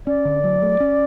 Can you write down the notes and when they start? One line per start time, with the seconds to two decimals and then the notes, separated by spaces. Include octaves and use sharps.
0.07 C#4 D5
0.25 D3
0.44 F#3
0.62 A3
0.80 C#4